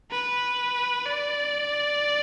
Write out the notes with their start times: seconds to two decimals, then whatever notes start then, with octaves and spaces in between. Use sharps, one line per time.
0.11 B4
1.06 D5